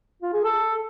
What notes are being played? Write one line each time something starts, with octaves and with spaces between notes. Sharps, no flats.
F4
G#4
A4